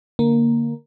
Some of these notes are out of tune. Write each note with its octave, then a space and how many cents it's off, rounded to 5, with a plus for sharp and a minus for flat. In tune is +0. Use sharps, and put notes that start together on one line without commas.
D3 +0 A#3 +0